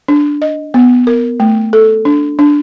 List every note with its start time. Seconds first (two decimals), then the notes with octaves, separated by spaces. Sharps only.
0.08 D4
0.42 D#5
0.74 B3
1.07 A#4
1.40 A3
1.73 A4
2.05 D4
2.39 D4